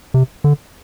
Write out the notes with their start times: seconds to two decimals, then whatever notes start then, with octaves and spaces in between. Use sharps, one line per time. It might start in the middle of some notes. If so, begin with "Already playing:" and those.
0.14 C3
0.44 D3